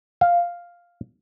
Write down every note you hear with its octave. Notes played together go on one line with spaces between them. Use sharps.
F5